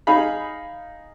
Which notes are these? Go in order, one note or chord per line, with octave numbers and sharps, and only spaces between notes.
D#4 G#4 F5 B5